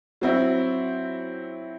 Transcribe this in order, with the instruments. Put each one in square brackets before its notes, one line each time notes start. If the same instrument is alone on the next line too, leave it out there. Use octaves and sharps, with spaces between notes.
[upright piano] F#3 C4 E4